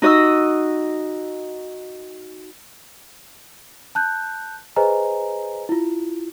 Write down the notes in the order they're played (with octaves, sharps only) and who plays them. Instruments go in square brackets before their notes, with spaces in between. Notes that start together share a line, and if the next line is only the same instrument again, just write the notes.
[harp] D#4 F#4 D#5 D#6 E6
[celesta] A5 F#6 G6
G#4 B4 C5 D#5 G#5 A#5
E4 F4